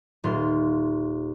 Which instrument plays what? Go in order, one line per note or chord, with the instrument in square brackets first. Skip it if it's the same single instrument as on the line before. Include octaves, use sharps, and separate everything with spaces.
[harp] D#1 F4 C6